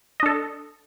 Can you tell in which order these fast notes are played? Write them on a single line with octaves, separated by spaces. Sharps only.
D#5 D4 A4